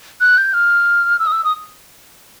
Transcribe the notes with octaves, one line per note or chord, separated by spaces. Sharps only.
F#6
G6
F6
E6
D#6
E6
D#6